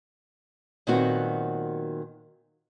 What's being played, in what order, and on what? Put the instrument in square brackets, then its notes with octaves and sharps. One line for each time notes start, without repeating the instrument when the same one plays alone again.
[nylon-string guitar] A#2 D#3 F#3 B3 C4 F#4